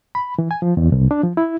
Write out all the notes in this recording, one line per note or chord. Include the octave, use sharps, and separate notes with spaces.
B5
E3
G#5
F3
E2
C2
D4
F3
E4